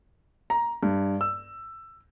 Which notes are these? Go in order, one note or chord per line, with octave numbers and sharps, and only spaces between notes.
A#5
G2
E6